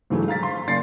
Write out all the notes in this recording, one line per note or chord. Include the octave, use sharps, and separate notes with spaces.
G#2 D3 E3 F#3 G3 A3
F5 A#5 A6 B6
C6
F#1 C#3 A#3 D5 A6 C7